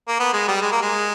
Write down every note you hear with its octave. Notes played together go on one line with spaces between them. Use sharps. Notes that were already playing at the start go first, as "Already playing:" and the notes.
A#3
B3
G#3
G3
G#3
A#3
G#3